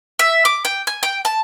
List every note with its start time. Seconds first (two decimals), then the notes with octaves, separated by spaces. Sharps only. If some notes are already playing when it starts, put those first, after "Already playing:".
0.19 E5
0.45 D6
0.65 G5
0.87 G#5
1.03 G5
1.25 A5